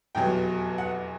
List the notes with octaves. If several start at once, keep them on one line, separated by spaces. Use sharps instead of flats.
F1 E2 B2 F#3 G5
F#5